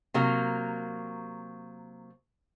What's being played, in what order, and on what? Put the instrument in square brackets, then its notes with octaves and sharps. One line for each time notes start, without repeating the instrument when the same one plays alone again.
[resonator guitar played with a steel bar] C3 F#3 A#3